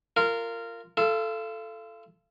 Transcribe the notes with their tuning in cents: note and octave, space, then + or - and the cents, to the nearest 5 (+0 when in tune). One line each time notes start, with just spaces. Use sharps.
F4 -15 A#4 -20
F4 -35 A4 +0